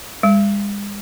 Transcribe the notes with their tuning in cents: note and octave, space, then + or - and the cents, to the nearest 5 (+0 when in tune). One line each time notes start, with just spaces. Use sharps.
G#3 -40